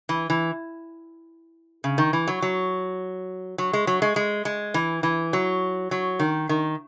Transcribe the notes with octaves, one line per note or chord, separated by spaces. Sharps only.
E3
E3
C#3
D#3
E3
F#3
F#3
F#3
G#3
F#3
G#3
G#3
G#3
E3
E3
F#3
F#3
D#3
D#3